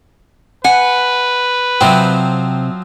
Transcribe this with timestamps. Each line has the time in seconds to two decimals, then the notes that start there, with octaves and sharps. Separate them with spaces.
0.65 B4 F#5 G#5
1.81 C3 F3 F#3 C4 G5